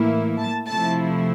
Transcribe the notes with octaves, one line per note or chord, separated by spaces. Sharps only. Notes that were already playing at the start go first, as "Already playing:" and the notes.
Already playing: A2 E3 A#3 E4
A5
C3 F3 A3 E4 A5